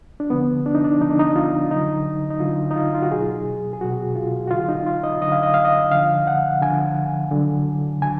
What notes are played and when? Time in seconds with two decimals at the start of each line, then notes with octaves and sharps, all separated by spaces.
0.20 D4
0.30 D3 F3 B3
0.66 D4
0.74 D#4
0.84 D4
1.01 D3 F3 D#4
1.10 D4
1.19 D#4
1.36 F4
1.71 D3 F#3 D#4
2.30 D#4
2.40 D3 F#3 F4
2.71 D#4
2.76 F4
2.94 F4
3.02 F#4
3.11 B2 F#3 G#4
3.73 G#4
3.81 B2 F#3 F#4
4.16 F4
4.47 F#4
4.51 D3 F#3 F4
4.69 D#4
4.87 F4
5.03 D#5
5.22 D3 F#3 D#5
5.32 F5
5.43 D#5
5.54 F5
5.65 D#5
5.91 D3 F3 F5
6.27 F#5
6.62 D3 F3 G#5
7.32 D3 F#3
8.02 D3 F#3 G#5